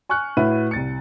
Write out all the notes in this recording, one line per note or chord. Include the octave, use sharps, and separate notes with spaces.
G#5 C#6 F6 F#6
A2 F#4 B4 E5 D#7
C2 A6 C#7